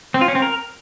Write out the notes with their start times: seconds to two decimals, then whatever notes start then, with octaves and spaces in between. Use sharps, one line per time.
0.14 C4
0.21 F4
0.28 C#4
0.35 C4
0.42 A#4